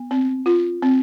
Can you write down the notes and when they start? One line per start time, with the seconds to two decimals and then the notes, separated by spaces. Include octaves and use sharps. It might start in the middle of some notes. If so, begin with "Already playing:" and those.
Already playing: B3
0.11 C4
0.46 F4
0.82 C4